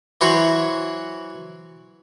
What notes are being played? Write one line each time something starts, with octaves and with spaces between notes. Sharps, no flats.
E3 F#3 E4 F#4 C5 C#5